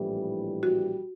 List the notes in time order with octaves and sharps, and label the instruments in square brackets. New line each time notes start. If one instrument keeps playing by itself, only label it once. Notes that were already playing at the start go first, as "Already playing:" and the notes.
Already playing: [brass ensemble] A#1 A2 E3 G3
[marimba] F#4